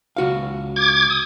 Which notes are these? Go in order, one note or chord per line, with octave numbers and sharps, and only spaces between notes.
C#2 F#4 F5
D6 G#6
D#6